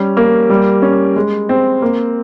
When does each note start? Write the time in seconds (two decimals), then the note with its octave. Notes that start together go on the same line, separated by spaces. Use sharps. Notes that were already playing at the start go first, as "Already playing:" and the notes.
Already playing: G3 C#4
0.17 A#3
0.50 G3
0.82 C#4
1.16 G#3
1.49 C4
1.82 A#3